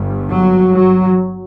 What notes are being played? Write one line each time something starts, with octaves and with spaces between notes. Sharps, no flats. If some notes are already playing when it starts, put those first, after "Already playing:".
Already playing: G1 G2
F#3
F#3